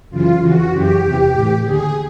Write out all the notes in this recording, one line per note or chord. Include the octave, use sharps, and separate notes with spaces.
F#2 C#3 E3 F4
F2 C#3 E3 F#4
F#2 C#3 E3 G4
E2 C3 E3
A2 E3
D#2 D3 G#4